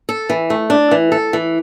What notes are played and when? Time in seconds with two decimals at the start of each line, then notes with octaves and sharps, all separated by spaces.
0.09 A4
0.30 E3
0.50 A3
0.70 D4
0.91 E3
1.12 A4
1.33 E3